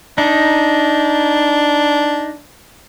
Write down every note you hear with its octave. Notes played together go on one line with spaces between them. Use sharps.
D4 D#4